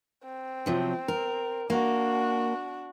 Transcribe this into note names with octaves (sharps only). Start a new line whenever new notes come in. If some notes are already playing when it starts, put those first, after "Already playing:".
C4
C3 F3 F#3
A#4
A#3 D4 F#4